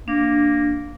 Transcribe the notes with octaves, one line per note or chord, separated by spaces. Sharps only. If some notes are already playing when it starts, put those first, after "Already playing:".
A#3 D4